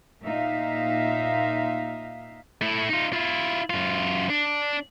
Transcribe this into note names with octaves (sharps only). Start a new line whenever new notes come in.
A#2 D#4 E5 F5
A3 E4
D#4 F4
E4 F4
F#2 F4
D4